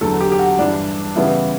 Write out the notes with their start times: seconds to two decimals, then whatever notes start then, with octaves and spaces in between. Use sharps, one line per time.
0.01 E2 D3 F#3 A4
0.21 G4
0.32 G4
0.39 F#4
0.58 G2 E3 G3 D4
1.16 C#3 E3 G3 B3 E4